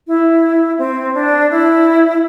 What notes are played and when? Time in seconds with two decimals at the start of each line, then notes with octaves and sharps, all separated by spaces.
0.07 E4
0.78 C4
1.14 D4
1.51 E4